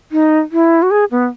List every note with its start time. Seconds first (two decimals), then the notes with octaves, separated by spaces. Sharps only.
0.12 D#4
0.52 E4
0.82 F#4
0.91 G#4
1.11 B3